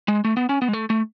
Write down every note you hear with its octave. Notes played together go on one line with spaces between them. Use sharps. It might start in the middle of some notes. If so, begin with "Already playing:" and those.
G#3
A3
B3
C#4
B3
G#3
A3
A3